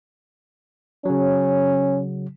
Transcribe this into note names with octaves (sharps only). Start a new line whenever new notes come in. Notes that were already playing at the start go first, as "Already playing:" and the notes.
C#3 F#3 C#4